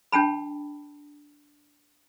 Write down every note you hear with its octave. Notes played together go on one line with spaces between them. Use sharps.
D4 G5 A5 B5